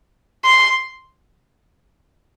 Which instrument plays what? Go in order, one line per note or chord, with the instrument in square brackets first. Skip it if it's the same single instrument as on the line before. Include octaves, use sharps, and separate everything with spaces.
[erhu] C6